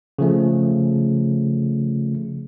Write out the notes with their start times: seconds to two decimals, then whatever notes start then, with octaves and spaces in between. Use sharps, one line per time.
0.19 C#3 F3 A3